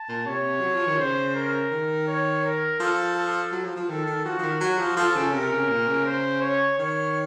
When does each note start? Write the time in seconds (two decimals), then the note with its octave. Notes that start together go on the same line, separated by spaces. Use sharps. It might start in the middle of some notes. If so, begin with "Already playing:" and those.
Already playing: A5
0.09 A#2
0.26 C3 C#5
0.60 F#3
0.74 F3
0.87 D#3
0.99 C#3 C5
1.36 A#4
1.72 D#3
2.08 C#5
2.44 A#4
2.80 F3 A4
3.16 A4
3.52 F#3
3.64 F3
3.76 F3
3.89 D#3 A4
4.06 D#3
4.25 F3 F#4
4.39 F3
4.42 D#3
4.60 F#3 F#4
4.79 F3
4.96 F3 A4
5.16 C#3
5.33 C3 A#4
5.51 C#3
5.69 A#2
5.87 C#3
6.06 C5
6.41 C#5
6.78 D#3 C#5